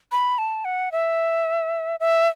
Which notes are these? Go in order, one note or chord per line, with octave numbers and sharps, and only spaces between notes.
B5
A5
F#5
E5
E5